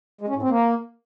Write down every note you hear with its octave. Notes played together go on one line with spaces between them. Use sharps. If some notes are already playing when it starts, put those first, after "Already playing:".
G#3
C#4
A2
C4
A#3